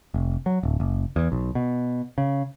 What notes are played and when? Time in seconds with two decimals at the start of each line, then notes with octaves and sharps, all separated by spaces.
0.14 F1
0.46 F#3
0.63 D1
0.80 F#1
1.16 E2
1.32 B1
1.55 B2
2.18 C#3